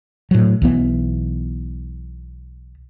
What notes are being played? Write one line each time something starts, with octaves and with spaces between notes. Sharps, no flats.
A2 F#3
B1 E3 B3